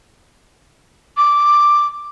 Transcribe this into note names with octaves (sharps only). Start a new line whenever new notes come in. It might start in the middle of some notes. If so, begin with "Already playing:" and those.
D6